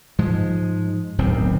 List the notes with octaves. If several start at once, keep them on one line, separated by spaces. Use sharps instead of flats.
G#2 F3 G#3
D1 B1 D#3 C4